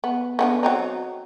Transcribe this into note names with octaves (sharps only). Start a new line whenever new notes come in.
B3
D3 F#3 B3
F#3 C4 D#4